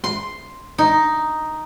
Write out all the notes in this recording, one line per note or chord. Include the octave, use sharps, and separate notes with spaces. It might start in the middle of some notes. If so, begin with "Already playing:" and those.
C6
D#4